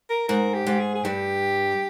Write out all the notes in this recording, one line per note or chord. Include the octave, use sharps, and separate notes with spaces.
A#4
G#2 A#4
G4
G#2
G#4
G#4
G2 G4